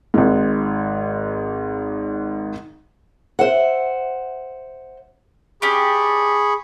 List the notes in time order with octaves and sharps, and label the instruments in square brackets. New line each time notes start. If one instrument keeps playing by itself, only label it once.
[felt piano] G#1 G#2
[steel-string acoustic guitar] C5 E5 F#5
[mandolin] C#4 D4 G4 [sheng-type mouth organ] G#4 B5 C#6